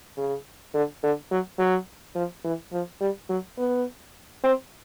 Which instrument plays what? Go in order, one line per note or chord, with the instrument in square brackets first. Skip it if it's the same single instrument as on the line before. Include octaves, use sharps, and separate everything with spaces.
[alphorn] C#3
D3
D3
F#3
F#3
F3
E3
F3
G3
F#3
B3
C4